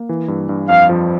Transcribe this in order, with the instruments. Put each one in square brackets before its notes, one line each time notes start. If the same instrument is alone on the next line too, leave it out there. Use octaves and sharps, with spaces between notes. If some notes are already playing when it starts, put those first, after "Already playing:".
Already playing: [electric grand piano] A#3
E3
G2
G2
[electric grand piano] F2 [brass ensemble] F5
[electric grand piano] F3